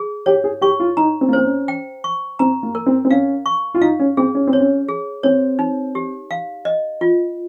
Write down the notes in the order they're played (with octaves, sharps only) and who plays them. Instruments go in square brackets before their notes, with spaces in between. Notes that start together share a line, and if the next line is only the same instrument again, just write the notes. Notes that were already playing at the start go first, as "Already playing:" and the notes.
Already playing: [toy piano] G#4
[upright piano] G4 [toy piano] C#5
[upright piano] G#4
[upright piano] G4 [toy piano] C#6
[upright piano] F4
[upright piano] D#4 [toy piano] A#5
[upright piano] C4
A#3
[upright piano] C4 [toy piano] C5
[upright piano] C#4
[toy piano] G5
C#6
[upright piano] C4 [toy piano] A#5
[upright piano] A#3
[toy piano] A#4
[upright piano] C4
C4
[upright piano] C#4 [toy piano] F5
[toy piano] C#6
[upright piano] F4
[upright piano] D#4 [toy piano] F5
[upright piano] C#4
[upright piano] C4 [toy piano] G#4
[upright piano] C#4
C4
[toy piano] C#5
[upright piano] C#4
[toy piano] G#4
[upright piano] C4 [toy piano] C#5
[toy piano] D#4
G4
F5
D#5
F4